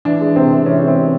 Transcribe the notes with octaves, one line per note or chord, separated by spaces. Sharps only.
E3 D4
G#3
C3 C4
C3
E3 C#4
G#3
C4
C3